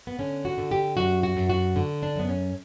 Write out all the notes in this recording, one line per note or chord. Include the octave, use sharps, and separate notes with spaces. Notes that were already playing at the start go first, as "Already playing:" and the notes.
B3
D3 C#4
F#4
D3
G4
F#2 F#4
F#4
F#2
F#4
D3
D4
F#2 B3
C#4